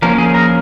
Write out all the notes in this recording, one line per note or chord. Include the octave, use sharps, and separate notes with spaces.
F3 A#3 C#4 A#4
G#4
A#4